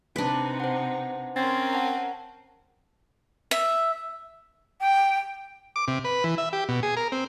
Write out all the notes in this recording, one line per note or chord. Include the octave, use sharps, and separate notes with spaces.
C3 D4 D#4 B4
C5 F#5
C4 C#4 A#4 C6 G#6 A6
F#5 A5
E5
G5
D6
C3
B4
E3
E5
G4
B2
G#4
A#4
C4